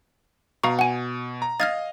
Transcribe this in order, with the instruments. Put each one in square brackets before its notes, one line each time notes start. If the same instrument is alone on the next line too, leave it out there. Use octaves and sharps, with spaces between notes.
[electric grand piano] B2 [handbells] F5 A#5 C#6
[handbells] F#5 G#5
[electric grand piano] A#5
[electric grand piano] D#5 F5 [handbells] F6 G#6 A6